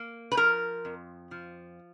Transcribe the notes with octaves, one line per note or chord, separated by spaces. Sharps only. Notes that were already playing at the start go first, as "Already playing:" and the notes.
Already playing: A#3
B4
F3 A#4
F2
F3